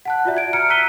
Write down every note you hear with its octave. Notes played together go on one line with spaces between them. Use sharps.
F#5 A5 F#6
F4 F#4 D5 E5
G#6 D7
A#5 F6 C#7 D7
A#5 E6 F#6 B6 D#7 G7